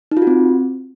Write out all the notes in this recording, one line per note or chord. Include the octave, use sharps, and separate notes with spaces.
D#4
F4
F#4
C4